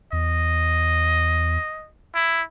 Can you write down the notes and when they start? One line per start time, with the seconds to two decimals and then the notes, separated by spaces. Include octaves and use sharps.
0.13 E2 D#5
2.15 E4